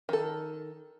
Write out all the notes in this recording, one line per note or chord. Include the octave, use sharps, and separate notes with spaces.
D#3 A4